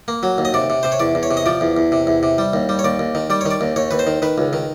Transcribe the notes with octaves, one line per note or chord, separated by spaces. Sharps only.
A#3
F#3
D#2
D#5
C3 D5
C3
C3 C5
C#5
E2 D5
E2
C#5
C3
D#5
F3 D5
E2
E2
C3
E2
C3
G3
D#2
G3
C#5
D#2 D5
D#2
D#3
G3 D5
D#3 C#5
D5
D#2
D#2 C#5
D#2 B4
C5
D#3
D#3 B4
C#2
D#3